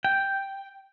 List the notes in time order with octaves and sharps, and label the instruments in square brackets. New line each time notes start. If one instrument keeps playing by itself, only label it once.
[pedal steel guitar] G5